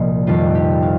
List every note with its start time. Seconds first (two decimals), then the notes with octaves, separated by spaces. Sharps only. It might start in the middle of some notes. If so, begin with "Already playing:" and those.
Already playing: C2 A#2 F3 D#5
0.27 F2 D#3 G3 F4
0.55 G4
0.82 F5